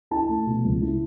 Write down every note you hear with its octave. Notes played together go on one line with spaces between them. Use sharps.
E4 A5
A3
B2
C#2
E4